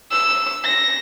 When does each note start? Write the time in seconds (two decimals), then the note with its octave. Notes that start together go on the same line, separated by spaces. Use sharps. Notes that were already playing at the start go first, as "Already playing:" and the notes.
0.11 E6
0.65 A#6